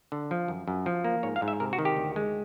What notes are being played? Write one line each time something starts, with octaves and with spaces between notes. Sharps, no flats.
D3
F3
F#2
F#2
F3
A#3
G#2 C#5
F5
G#2
E5
C3 A#4
F#4
D#3
G4
D2
G#3